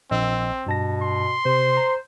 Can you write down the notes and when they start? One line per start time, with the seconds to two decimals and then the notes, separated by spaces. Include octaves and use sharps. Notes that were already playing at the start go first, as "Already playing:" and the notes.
0.11 A#1 C4 D#5 E6
0.66 G2 B2 A5 A#6
1.02 C6
1.45 C3 C5
1.77 A#5